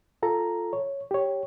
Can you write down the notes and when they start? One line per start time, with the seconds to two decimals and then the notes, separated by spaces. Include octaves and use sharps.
0.22 F4 A4 A#5
0.73 C#5
1.11 G4 C#5